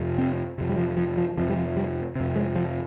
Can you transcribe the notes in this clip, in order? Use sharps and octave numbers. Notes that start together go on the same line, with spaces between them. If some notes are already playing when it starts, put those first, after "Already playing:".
Already playing: F2 C3
C4
F2 C3
G3
F3
F3
F3
F2 C3 F3
G3
F3
G3
F2 C3
G#3
F3